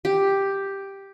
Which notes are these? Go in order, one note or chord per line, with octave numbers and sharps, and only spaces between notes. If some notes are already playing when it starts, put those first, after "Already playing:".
G4